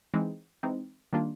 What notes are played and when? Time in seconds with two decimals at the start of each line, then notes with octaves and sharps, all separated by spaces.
0.14 E3 G#3 C4 D#4
0.63 E3 G#3 C4 D#4
1.13 D#3 G3 A#3 D4 F4